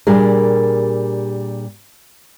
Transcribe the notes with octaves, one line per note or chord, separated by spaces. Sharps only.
A#2 G3 D4 G4 G#4 A#4